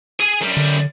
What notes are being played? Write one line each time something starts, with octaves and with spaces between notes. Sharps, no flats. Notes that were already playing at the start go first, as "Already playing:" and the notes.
G#4 G#5
F#2 G3
D3